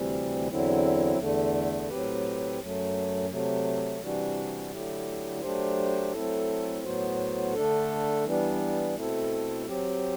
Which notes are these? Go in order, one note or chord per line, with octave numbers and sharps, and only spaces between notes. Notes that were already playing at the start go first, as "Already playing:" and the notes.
Already playing: D2 C3 E3 G3 C4
E2 D3 F#3 C4 E4
E2 D3 A3
A2 F#3 C4 G4 B4
F#2 F#3 A3
C3 F#3 A3
C3 E3 G3 D4 F#4
D3 F#3 A3 E4 G4
F#3 A3 D4 G4 C5
F#3 A3 C4 E4 A4
A2 F#3 B3 F#4 C5
D3 A3 D4 A4
E3 G3 B3 D4
B2 A3 C4 E4 A4
F#3 C4 G4